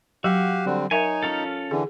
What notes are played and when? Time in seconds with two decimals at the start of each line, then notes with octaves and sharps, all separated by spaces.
0.24 F#3 F#4 G4 F5
0.66 D3 G3 C4
0.91 D#4 A#4 C#5 E5 G#5
1.23 C#4 F4 A4
1.71 D3 E3 G#4